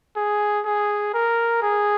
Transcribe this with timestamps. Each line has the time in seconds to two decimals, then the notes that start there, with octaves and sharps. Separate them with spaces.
0.16 G#4
0.65 G#4
1.14 A#4
1.62 G#4